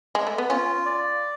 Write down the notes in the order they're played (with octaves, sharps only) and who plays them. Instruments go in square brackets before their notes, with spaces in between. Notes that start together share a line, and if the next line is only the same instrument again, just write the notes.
[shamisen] G#3
A3
B3
[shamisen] C#4 [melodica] F4
[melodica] D5